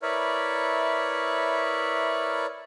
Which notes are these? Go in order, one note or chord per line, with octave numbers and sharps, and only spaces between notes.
E4 A#4 B4 C#5 D5 E5